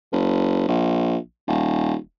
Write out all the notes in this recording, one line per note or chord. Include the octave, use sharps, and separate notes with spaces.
F#1
A#1
D#1